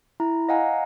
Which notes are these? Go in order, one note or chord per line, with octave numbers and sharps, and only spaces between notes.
E4 A#5
D#5 F5 F#5 G#5 A#5